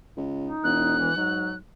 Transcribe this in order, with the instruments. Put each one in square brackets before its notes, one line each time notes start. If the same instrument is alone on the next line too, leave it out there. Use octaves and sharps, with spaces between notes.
[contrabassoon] C#2
[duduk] D#4
[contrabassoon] E1 [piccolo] F#6
[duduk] E3
[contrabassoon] G#2 [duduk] F#3